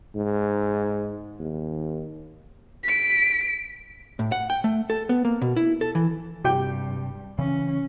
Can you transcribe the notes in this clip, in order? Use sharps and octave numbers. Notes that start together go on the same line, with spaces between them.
G#2
D#2
B6 D7
A2
F#5
G5
A3
A4
B3
A#3
B2
E4
A4
E3
G2 C3 G4 G5
C#3 E3 C#4